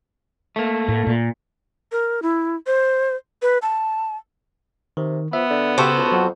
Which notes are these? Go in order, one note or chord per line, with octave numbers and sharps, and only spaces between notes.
A3 A#3
A2
A#2
A#4
E4
C5
B4
A5
C3 D#3
F3 B3 E5
D3
C#3 F#4 G4 A4 C5
C#2
F2 F#3